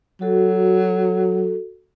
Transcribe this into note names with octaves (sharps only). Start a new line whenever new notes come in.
F#3 F#4 A4